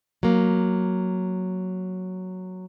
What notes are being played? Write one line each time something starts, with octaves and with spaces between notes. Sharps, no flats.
F#3 A#3